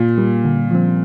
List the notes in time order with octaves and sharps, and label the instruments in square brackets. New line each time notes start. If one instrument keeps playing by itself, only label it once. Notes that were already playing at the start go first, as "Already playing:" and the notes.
Already playing: [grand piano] A#2
[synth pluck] G3 A#3
D3
F3 C4